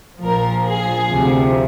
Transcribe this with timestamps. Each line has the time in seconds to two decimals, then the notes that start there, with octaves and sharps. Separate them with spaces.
0.22 A#1 A#2 F3 A#4
0.65 G#4
1.08 D2 C3 F3